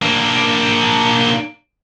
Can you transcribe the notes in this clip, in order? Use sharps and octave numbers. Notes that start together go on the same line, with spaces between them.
A#3 D4